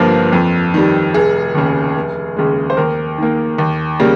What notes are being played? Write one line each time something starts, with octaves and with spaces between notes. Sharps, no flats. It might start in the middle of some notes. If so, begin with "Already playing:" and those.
Already playing: G1 G2 F3 A#3
F2
D#3 G3
F1 G#4
D#2 C#3
F1
D#2 C#3 G#3
C5
D#2 A#4
D#3 A#3
D#2
C#3 G3 A#3